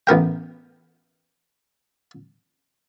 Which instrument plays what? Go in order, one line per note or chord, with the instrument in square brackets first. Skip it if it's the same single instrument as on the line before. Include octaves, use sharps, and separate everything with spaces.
[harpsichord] A1 B3 A#4 G5